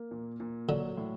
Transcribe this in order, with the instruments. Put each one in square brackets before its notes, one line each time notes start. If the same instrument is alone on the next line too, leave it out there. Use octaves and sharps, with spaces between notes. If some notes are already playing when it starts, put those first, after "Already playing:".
Already playing: [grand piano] A#3
A#2
A#2
[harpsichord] D3 [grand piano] F#3
[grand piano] A2